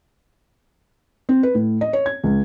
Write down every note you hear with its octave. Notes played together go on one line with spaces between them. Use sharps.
C4
B4
A2
D#5
C#5
G#6
C#2